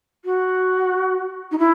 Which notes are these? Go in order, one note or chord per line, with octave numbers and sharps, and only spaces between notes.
F#4
D#4
E4